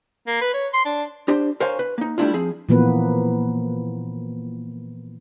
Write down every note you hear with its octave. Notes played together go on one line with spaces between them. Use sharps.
A#3
B4
C#5
C6
D4
D4 G4 C5
A#4 C5 C#5 F5 G#5
B4
A#3 D#4
G3 A3 C#4 D4 E4 F4
F3 C4 G#4
A#2 E3 F3 A#3 B3 B4